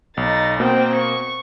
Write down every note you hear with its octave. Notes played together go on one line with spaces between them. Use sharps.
B1 D#4 A6
B2 A#3 C4 G5
C#6